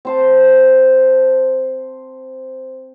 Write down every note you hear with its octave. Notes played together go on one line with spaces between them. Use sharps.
C4 C5 A5